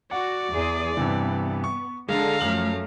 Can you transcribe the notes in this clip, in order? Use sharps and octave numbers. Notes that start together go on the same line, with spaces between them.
F#4 D5 F#5
E2 G#4
G2 C3 E3 B3
C#6
D3 G#3 A4 F5 A#5
F#2 F3 A3 F6 F#7